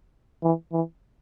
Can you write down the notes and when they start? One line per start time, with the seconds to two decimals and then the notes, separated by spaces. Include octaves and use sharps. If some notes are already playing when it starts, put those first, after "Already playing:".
0.43 E3
0.72 E3